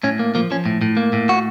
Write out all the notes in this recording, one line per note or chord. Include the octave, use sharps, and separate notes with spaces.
A2 C#4
A#3
F3 A#3
F3 C#4
A2
A2
A#3
A2
F#4